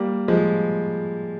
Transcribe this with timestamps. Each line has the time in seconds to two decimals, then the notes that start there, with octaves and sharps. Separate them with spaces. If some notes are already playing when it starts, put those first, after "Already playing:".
Already playing: G3 A#3
0.28 F3 G#3